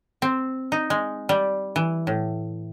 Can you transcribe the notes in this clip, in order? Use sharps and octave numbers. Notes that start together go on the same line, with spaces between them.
C4
D#4
G#3
G3
E3
A2